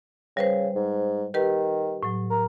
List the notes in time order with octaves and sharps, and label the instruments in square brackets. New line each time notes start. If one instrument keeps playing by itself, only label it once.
[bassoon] C#3 [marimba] G3 B4 C5
[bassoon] G#2
[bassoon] D#3 [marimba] G4 B4
[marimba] A2 F#3
[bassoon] A#4